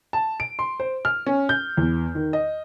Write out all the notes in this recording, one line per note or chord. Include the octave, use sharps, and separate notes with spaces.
A5
D7
C6
C5
F6
C#4
G6
E2
D#3
D#5